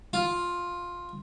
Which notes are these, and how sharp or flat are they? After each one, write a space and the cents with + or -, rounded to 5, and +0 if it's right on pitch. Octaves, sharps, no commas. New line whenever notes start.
F4 +5